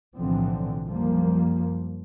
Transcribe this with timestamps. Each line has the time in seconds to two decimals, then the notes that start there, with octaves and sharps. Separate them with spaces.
0.19 B1 A2 D3 E3 F3 C4
0.86 F#2 F3 G3 A#3